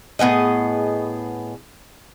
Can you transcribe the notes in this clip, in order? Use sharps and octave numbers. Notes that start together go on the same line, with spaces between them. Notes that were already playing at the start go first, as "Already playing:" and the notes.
A2 B3 G#4 D#5